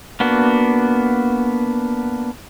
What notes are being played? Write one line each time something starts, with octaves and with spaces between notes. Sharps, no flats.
A#3 B3 D4 F#4